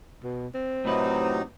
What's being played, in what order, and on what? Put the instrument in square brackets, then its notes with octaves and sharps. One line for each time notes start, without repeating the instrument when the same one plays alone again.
[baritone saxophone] B2
C4
[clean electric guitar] A2 B4 [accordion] C3 F#3 D#4